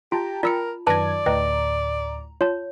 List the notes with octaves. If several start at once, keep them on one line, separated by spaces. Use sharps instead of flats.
F4 G4 G5 A5 A#5
F4 A#4 D5 E6 C#7
F#2 D#3 B4 D5 A5 G#6 A#6
D2 A2 B4 D#5 G5 A#5
F4 C#5 A5